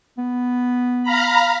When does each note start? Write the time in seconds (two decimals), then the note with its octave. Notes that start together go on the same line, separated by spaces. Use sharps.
0.18 B3
1.03 F5 A#5 B5